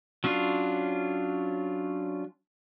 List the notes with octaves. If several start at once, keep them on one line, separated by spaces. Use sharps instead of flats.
F#3 C#4 D4 F4